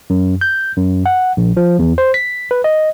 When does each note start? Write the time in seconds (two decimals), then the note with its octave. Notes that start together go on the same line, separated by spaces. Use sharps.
0.10 F#2
0.41 G6
0.77 F#2
1.06 F#5
1.37 A#1
1.57 F3
1.79 E2
1.98 C5
2.14 B6
2.51 B4
2.64 D#5